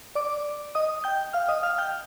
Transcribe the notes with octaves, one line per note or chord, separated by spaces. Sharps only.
D5 D6
D#5 D#6
G5 G6
F5 F6
D#5 D#6
F5 F6
G5 G6